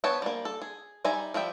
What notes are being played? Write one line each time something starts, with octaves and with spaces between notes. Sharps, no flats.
B3 C5 C#5 G5 A5
G3 A#3
A4
G#4
G3 D#4 E5 G#5 A#5
F3 G3 E5 G5